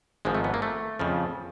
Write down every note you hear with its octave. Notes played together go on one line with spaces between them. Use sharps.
G#1 G#2 F3 G#3
A3
B3
A#3
A3
F2 C#3 F3